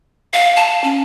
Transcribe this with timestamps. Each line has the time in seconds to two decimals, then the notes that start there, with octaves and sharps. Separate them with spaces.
0.33 F5
0.56 A5
0.84 C#4